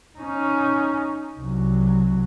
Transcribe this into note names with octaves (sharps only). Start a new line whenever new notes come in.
C#4 D#4
C2 F#3